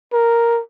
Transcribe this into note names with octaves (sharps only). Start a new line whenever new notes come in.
A#4